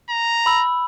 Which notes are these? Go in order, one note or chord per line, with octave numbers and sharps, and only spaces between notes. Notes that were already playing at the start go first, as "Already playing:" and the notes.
A#5
B5 E6